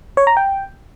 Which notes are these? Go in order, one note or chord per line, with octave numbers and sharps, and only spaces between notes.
C#5
A#5
G5